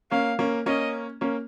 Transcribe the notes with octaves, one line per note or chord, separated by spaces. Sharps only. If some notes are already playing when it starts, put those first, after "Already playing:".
A#3 C#4 F5
A#3 C#4
A#3 C#4 D#5
A#3 C#4